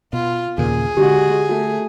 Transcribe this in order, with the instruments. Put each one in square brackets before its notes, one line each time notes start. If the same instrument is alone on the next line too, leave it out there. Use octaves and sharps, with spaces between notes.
[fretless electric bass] B2 [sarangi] F4
[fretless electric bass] D#2 A#2 C#3 [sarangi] G#4
[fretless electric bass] D3 [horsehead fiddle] G#3 F#4 [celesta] G4
[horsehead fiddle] A3 [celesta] F#4